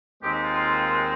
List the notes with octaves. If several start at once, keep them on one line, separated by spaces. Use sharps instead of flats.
D#2 D#3 G#3 C4 D#4 G4
G4
F4
F4